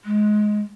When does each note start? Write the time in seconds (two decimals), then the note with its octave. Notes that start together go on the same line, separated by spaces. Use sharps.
0.05 G#3